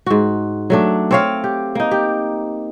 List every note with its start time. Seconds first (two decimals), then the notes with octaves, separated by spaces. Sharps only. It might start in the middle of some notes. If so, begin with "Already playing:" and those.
0.06 G#2 F#4
0.70 F#3 A3 D4
1.11 C4 C#5 F5
1.44 G4
1.75 A#3 D#4
1.91 G4